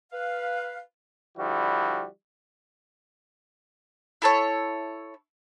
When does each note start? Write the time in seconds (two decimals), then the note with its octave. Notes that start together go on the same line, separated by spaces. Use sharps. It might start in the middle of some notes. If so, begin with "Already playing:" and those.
0.12 B4 F5
1.38 D3 F3 G3 E4 F#4
4.22 E4 A4 C#5